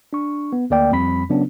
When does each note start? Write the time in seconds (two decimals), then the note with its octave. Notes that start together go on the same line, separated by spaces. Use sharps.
0.13 D4 C#6
0.53 B3
0.70 D2 A#3 D5 G5
0.91 F2 G3 C4 B5 B6
1.29 C#3 F#3 B3 C#4 D4